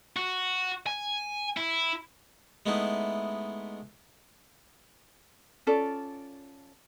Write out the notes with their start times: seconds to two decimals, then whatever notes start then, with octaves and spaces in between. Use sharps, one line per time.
0.16 F#4
0.87 G#5
1.57 E4
2.66 G#3 A3 B3 D#4 E4
5.67 C#4 F4 A4 D5